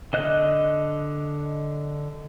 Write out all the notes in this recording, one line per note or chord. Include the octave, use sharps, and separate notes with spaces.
D3 D#5 F#6